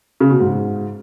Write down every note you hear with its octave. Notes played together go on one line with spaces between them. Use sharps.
C#3
B2
G#2